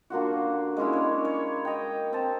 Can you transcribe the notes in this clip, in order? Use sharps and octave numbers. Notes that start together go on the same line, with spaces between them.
D3 A#3 F4 F#4
G#3 A#3 C#4 E4
C#5 D5
C#5
D#5 G5
C4 A5